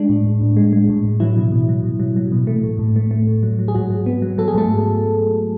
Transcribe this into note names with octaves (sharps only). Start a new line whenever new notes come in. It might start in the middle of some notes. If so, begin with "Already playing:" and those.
Already playing: G#3 D4
A2
A2
A2
G#3
G#3
A2
A2
E3 F#3 E4
B2
B2
F#3
B2
F#3
F#3
B2
A3
A2
A2
A3
A3
A2
F#3
F#3
G#4
G#2 F#3 F#4
F#3
B3
F#3
F#3 A4
G#4
G#2 A3 A4